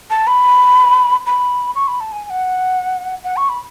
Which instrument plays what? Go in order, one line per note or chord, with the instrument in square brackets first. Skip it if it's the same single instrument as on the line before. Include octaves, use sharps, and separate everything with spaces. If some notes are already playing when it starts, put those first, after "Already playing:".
[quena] A5
B5
B5
C#6
B5
A5
G#5
G#5
F#5
F#5
C#6
B5